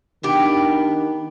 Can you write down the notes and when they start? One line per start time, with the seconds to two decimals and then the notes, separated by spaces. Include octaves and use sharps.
0.23 D#3 B3 D4 G4